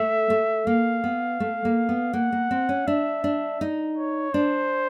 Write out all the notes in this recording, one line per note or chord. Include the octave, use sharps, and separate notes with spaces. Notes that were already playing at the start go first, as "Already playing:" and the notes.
Already playing: A3 E5
A3
A#3 F5
B3
A3
A#3
B3
A#3 F#5
A#3
C4
C#4
D4 E5
D4
D#4
C#5
D4 C5